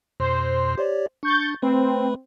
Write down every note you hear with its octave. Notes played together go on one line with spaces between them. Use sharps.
F2 B2 C5
G4 C#5 D5
D4 C#6 G6 A6
A3 C4 B4 B5